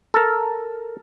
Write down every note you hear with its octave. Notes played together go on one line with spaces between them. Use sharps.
A4 A#4